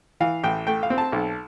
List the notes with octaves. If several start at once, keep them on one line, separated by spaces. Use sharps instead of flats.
E3 F5
A1 G5
A3 G5
F5
C4
A5
B1